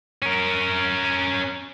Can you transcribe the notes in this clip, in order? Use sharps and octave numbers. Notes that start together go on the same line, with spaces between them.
C#4 A#4